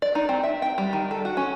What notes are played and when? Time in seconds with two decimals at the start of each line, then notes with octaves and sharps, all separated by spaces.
0.02 D5
0.15 D#4
0.29 C4
0.44 E5
0.62 G5
0.78 G3
0.93 D#3
1.11 A4
1.25 F#4
1.37 C#4